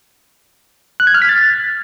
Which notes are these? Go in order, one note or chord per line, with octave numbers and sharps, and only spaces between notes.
F#6
G#6
F6
B6
A6